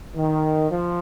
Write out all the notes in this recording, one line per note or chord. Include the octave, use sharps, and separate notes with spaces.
D#3
F3